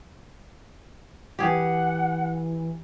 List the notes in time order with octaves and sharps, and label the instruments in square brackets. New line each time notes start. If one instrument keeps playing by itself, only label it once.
[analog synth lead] E3 [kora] G4 G#4 [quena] F#5